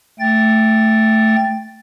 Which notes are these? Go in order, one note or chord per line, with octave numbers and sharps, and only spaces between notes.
A3 G5 A6